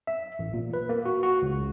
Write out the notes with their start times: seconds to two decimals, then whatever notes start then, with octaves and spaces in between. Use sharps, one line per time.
0.07 E5
0.39 A1
0.54 A#2
0.74 B4
0.89 A#3
1.05 F#4
1.23 F#4
1.42 C#2